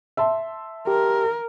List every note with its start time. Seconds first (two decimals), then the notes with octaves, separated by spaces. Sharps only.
0.17 E5 A5 C6
0.87 G4 A#4